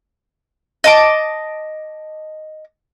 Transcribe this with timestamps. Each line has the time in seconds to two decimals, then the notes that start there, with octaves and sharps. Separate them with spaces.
0.84 D#5 A5 D6